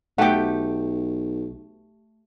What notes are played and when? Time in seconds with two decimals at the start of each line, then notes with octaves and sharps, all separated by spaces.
0.18 B1 A3 G4 F#5 G5